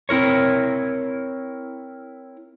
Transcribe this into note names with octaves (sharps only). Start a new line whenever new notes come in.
C4 E4 A#4 C#5